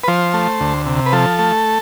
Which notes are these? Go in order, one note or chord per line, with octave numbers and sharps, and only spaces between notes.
B4
F3 C5
A3
D2
C3
B4
F3 A4
A3